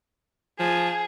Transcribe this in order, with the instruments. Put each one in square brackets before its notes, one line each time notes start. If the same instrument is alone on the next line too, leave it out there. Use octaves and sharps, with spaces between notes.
[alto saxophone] F3 [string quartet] G#4